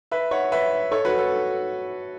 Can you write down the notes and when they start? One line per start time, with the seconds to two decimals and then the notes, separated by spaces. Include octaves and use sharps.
0.11 B4 E5
0.31 C#5 F#5
0.52 B4 E5
0.91 A4 C#5
1.05 F#4 B4
1.18 A4